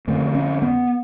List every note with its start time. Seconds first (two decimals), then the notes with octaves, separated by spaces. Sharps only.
0.07 F2 D3 A3
0.35 C#4
0.62 B3